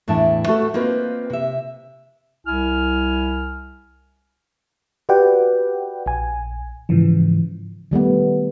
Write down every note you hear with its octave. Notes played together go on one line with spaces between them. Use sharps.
E2 A2 D4 E5 A5
A3 F#4 A4
A#3 C4 D#4 F4 B4
C3 E5
C2 E4 G#5 F6
F#4 G4 B4 D5 F#5 G5
A#1 G#5
G#2 C#3 E3 F3
D#3 G3 A3 B3